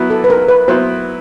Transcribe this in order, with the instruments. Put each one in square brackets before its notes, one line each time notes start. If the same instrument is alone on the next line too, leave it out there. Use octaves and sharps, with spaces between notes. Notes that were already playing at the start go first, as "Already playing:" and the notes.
Already playing: [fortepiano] F#3 B3 E4
[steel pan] A4
B4
A#4
A#4
B4
[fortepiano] F#3 B3 E4 [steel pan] C5